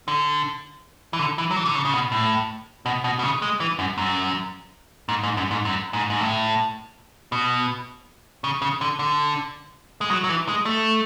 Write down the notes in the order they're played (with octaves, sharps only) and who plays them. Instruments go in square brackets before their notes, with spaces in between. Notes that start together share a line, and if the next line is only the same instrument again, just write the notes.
[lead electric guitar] D3
E3
D3
E3
F#3
E3
D3
C#3
C#3
B2
A2
B2
B2
B2
C#3
G#3
E3
F#2
F#2
G#2
G#2
F#2
G#2
F#2
G#2
G#2
A2
B2
C#3
C#3
D3
D3
G#3
F#3
F#3
E3
G#3
A3